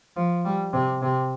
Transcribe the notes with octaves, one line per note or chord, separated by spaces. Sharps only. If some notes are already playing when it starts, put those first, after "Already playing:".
F3
G3
C3
C3